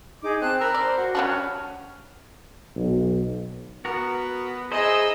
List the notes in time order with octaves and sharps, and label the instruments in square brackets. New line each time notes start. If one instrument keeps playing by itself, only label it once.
[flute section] D#4 G#4 D6
[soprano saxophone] C4 [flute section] A5 F#6
[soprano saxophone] A#4 [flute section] B5 E6
[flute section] C5 [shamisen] D5
[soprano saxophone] F#4
[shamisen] F#3 G3 D4 [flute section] C#4
[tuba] B1
[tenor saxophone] B3 [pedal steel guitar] F#4 A#4
[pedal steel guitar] D#4 E4 C5 [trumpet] G#4 [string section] D#5 E6